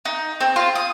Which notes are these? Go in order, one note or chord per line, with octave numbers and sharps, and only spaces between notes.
D#4
C4
F4
D#6